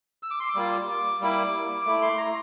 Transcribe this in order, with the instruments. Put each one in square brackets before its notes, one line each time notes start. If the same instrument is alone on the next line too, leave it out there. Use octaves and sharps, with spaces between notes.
[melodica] E6
D6
C6
D6
G3 A#3 F4
G3 A#3 E4
A3 E4 D6
C6
A#5